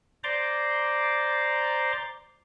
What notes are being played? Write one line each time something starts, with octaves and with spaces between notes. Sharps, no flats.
C5 D5 A#5 C6 D6